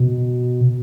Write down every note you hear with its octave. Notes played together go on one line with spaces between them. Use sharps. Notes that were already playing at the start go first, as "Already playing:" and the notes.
Already playing: B2